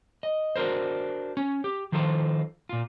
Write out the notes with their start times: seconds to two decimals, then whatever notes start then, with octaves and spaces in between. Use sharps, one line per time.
0.23 D#5
0.56 D4 F#4 A#4 C5
1.37 C#4
1.64 G4
1.92 D#3 F3 D#4 F4 A4 C5
2.69 A#2 F4